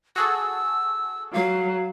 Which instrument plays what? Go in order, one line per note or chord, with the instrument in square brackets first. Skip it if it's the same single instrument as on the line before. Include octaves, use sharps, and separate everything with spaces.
[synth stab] F#4 G#4 A4 [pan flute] E6
[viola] F#3 [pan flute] F5